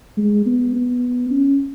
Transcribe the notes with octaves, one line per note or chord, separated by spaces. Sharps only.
G#3
B3
B3
C#4